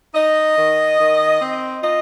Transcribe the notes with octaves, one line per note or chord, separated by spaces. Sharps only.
D#4 D#5
D#3
D#3
C4
F4 D#5